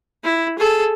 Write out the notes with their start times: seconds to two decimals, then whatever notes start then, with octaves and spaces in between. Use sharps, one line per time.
0.23 E4
0.58 G#4 A4